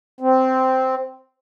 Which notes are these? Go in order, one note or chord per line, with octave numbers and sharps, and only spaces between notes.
C4